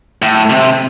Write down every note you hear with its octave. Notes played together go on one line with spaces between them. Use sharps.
A2
C3